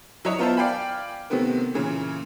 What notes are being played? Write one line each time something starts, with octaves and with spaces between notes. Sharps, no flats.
F#3 E4 C#5 D#5
B3 F4 A#4 C5 E5 A5
D5 F5 G5 G#5 B5
C3 D#3 A3 B3 C4
A#2 C#3 E3